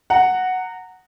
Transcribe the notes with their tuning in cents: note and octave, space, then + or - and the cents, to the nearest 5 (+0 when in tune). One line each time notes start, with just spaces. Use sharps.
F#5 +0 A#5 -20